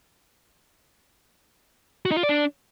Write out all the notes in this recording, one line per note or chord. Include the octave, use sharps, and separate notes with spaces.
F#4
D#4
F4
D5
D4